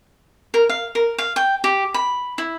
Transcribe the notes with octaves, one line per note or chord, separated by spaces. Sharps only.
A#4
F5
A#4
F5
G5
G4
B5
E4